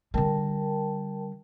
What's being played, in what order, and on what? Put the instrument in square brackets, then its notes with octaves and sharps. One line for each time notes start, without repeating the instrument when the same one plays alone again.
[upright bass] D3 G3 [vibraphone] A#4 G5 A5